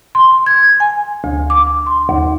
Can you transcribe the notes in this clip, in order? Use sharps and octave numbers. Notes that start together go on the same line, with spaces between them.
C6
G#6
G#5
D2
D6
C6
D#2